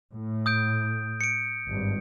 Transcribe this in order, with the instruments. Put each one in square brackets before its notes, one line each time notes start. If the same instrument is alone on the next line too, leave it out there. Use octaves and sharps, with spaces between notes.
[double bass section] A2
[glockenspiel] D#6 G6 D7
C#7 D7
[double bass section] G#1 G2